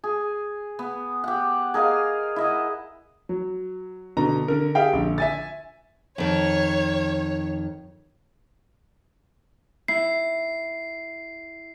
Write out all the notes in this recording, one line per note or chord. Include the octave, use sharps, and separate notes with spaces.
G#4
B3
G4 F#5
G#4 A#4 D#5 F5
E4 D#5 F#5
F#3
B2 D3 A#5
D3 A#4
G4 G#4 E5 F5 G5
A#1 D3
E5 G#5 A6
F2 D#3 C#5
E4 C7